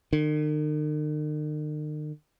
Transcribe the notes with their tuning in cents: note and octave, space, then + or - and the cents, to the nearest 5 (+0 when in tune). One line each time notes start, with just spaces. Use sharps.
D#3 -45